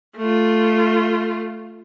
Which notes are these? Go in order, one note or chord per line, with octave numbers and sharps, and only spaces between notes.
A3 F4